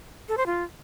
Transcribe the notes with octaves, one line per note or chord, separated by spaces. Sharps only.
A4
C5
F4